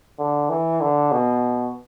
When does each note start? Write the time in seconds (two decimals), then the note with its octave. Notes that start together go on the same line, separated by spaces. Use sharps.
0.19 D3
0.49 E3
0.81 D3
1.11 B2